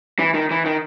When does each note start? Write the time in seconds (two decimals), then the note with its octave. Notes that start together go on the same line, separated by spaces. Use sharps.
0.19 E3
0.34 D#3
0.51 E3
0.66 D#3